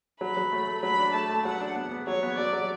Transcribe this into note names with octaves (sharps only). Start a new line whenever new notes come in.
F#3 B5
F#3
A3
A3
F#3 B5
D4
A3 A5
A3
F#3 F#5
D4
B3
B3
F#3 C#5
B3
F#3 D5
F#3